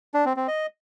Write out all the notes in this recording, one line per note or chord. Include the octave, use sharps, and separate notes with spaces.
D4
C4
C4
D#5